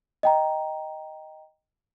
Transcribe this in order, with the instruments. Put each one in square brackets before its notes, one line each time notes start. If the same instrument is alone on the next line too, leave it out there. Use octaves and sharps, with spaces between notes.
[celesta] D#5 G5 A#5